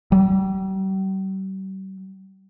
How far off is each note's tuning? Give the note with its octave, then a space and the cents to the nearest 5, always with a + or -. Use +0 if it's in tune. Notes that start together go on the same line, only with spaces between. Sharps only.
G3 -40